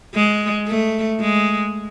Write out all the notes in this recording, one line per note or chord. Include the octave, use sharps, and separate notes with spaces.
G#3
A3
G#3